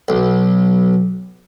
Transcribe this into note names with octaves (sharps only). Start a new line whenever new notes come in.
B1